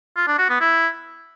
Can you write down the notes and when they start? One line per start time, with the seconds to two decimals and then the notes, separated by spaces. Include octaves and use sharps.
0.16 F4
0.27 D4
0.38 F#4
0.49 B3
0.60 E4